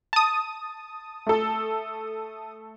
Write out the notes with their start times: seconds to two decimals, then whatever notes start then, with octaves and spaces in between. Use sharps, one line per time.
0.13 A5 D#6
1.27 A3 A4